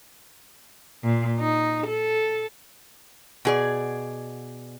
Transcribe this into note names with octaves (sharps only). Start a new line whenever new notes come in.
A#2
D#4
A4
B2 G#4 D5